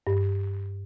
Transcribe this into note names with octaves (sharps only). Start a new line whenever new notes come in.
G2